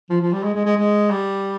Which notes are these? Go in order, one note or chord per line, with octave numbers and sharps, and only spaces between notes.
F3
F3
G3
G#3
G#3
G#3
G#3
G3